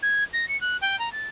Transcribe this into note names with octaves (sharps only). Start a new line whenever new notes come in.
G#6
A#6
C#7
F#6
G5
A#5
A6